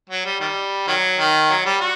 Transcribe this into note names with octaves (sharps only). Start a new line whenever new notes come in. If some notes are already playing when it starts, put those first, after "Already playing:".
F#3
G3
D#3 G3
D#3 F#3
D#3
F#3
G3
F#4